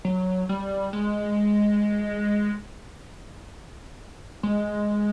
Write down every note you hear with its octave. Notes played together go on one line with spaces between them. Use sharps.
F#3
G3
G#3
G#3